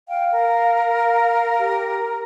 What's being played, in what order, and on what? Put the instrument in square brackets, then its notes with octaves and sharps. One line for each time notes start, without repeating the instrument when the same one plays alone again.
[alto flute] F5 [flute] G5
[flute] A#4
[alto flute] F5
F5
G4